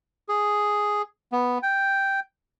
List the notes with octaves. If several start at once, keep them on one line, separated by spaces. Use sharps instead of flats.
G#4
B3
G5